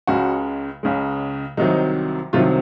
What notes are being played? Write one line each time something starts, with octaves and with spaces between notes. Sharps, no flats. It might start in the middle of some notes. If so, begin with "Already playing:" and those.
C#2 C#3 G#3 F#4
C#2 C#3 G#3
C2 C3 D#3 F#3 D#4
C2 C3 D#3 F#3 F4